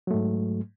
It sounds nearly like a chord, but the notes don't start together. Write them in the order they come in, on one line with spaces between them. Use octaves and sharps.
F#3 A3 G#2